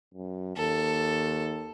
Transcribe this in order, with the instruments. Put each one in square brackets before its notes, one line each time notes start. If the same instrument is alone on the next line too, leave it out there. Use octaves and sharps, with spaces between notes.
[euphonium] F#2
[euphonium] D#2 [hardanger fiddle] A4